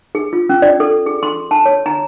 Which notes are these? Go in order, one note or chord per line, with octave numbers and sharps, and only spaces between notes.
G#4
F4
C#4
D5
A4
G#4
C6
A5
C#5
A#5